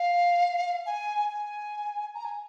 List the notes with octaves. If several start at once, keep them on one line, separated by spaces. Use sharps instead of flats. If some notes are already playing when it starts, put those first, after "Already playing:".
Already playing: F5
G#5
G#5
A#5
G#5